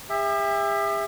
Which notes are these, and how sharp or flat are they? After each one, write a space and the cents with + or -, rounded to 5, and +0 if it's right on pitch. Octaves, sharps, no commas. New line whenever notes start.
G4 +45 E5 +0